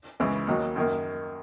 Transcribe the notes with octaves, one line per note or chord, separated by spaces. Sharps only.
C#2 C#3 E3
D#2 D#3 F#3
F#2 D#3 A#3